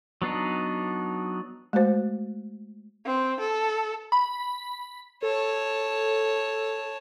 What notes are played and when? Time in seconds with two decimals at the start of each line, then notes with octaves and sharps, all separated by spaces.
0.22 F#3 B3 D4 D#4
1.73 G#3 A3 F#4 C5
3.06 C4
3.40 A4
4.12 B5
5.23 A4 C#5 A5